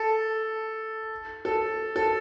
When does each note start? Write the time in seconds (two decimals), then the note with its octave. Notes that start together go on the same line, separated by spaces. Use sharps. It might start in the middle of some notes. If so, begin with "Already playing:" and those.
Already playing: A4
1.45 A4
1.96 A4